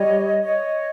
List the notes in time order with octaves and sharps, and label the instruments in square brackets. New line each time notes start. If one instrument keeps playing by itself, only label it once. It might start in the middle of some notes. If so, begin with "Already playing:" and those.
Already playing: [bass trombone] G3 [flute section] C#5 D#5
[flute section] C#5 D#5